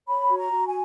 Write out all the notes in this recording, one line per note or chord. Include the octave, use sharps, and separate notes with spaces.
C#5 B5
F#4
A#5
F#4
G#5